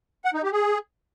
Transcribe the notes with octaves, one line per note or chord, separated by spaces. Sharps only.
F#5
D#4
G4
G#4